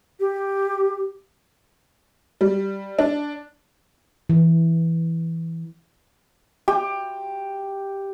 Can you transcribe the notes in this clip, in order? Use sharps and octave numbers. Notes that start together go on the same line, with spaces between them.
G4
G3
D4
E3
G4